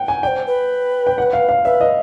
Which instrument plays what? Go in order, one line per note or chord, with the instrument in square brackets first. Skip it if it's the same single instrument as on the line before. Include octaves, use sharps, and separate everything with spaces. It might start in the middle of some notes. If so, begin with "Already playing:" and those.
Already playing: [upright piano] F#5 G5
G#5
[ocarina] D5 [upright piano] G5
[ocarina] C5
B4
[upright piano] G5
F#5
F5
F5
[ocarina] B4 [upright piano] E5
[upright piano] D#5